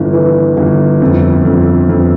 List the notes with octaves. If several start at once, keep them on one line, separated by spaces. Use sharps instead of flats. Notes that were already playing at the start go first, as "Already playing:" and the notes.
Already playing: G1 E3
E3
G1
F2
F2
F2